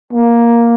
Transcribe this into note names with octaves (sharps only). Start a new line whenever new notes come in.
A#3